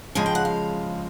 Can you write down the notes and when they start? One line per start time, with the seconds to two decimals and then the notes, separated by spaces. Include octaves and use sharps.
0.15 C#3 F3 G#3 G#5
0.26 G5
0.35 F#5
0.45 F5